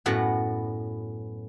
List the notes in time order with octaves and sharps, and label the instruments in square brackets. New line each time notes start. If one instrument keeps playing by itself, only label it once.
[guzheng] F#2 A2 B3 F#4